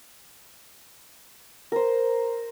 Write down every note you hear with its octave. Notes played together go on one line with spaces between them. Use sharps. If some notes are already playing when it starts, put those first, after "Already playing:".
A#4 C5